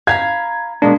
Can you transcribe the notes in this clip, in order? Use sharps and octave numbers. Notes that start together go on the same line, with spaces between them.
F5 A#5 B5 G#6
B2 G#3 A#3 D4